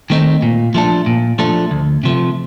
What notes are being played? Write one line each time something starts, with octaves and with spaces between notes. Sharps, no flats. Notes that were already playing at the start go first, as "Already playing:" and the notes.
D#3 A3 C4 D#4
A#2
F3 A3 D4 A4
A#2
F3 A3 D4 A4
D2
C3 F3 A3